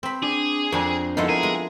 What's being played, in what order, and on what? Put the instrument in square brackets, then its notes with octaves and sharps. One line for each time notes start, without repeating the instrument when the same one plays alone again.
[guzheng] C4 B5
[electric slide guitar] D4 [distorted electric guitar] G#4
[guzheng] F2 D4 [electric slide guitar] A#4 C5 A#5
[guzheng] F3 G#3 E4 [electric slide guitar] B3 A4 F#5 [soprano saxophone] D#4
[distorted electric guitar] G#4 [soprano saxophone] A#4
[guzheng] G#3